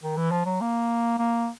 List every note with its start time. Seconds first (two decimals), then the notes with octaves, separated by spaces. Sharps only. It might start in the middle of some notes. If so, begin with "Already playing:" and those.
0.03 D#3
0.17 E3
0.31 F3
0.46 F#3
0.61 A#3
1.18 A#3